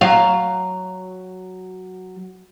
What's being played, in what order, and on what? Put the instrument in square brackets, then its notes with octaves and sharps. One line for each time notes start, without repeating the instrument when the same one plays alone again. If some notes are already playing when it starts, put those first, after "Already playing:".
[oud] F#3 F5